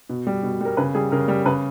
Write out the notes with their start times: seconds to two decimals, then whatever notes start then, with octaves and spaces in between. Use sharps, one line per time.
0.09 B2
0.27 G3
0.43 B2
0.61 G3 A#4
0.77 C#3 B4
0.95 G3 G#4
1.12 C#3 A#4
1.28 G3
1.46 C#3 B4